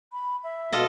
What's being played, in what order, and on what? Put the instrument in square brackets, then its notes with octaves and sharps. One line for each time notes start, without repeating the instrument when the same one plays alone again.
[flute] B5
E5
[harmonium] B2 [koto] F4 A4 D#5